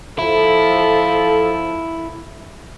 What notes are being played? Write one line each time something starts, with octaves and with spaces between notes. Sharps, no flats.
F3 E4 A4